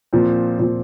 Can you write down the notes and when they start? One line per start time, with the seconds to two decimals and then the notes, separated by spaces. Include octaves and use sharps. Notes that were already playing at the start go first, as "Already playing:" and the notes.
0.13 A#2 F3 C4
0.59 A#2 F3 C4